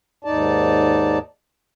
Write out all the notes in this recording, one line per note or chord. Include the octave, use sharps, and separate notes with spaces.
D#2 G#2 D#4 D5 A5